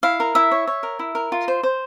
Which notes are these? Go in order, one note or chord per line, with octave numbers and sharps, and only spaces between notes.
E4 F5
A#4
E4 E5
C#5
C#5
A#4
E4
A#4
F4
C5
C5